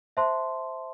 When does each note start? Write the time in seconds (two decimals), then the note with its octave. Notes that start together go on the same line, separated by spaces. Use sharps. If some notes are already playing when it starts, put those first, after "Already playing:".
0.17 C5 E5 A5 C6